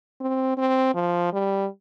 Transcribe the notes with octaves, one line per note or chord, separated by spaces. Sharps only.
C4
C4
F3
G3